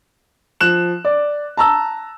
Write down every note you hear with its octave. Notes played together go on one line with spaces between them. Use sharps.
F3 F#6 E7
D5
A5 A#5 E6